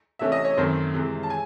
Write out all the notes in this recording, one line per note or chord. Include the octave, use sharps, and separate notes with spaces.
C3 E3 A3 C#4 E5
D#5
C#5
F#2 D#3 A3 C4 C5
C3 E3 G#3
A5
G#5